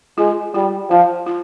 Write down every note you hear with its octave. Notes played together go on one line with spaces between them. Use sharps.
G#3 F4
G3 F4
F3 F4
F4